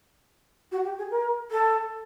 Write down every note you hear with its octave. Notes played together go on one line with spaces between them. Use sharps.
F#4
G4
G#4
A#4
A4